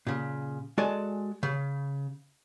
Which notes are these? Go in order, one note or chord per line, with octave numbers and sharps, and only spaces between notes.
A#2 C#3
G#3 F#4 A4 D5 G#5
C#3